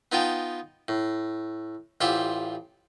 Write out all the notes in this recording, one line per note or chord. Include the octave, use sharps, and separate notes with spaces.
B3 D#4 F4 G5 A5
A2
A1 F4 G4 C5 E5 F#5